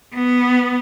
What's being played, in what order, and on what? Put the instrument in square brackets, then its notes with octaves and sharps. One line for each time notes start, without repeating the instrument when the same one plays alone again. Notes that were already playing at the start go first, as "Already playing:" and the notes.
[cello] B3